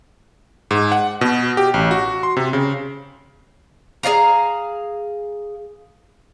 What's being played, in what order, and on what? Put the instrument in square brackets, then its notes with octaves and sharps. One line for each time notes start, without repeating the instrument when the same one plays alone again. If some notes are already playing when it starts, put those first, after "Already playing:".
[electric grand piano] G#2
F#5
B2
G4
A1
F#4
C6
C3
C#3
[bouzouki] G#4 D5 F5 A#5